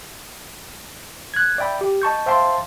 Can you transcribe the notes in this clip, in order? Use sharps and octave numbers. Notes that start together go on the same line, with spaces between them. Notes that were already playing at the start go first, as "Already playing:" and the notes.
F#6 G#6
D5 E5 G5 B5
G4
D#5 A5 C#6 G6
C5 E5 F5 G5 A5 C6